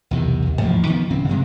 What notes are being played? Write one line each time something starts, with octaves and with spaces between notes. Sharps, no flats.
B1 E2 C3 D#3
D#2
A1 G#2 F3 A#3
D#3 F3 B3
D1 C#3 C4
G2 C3 G#3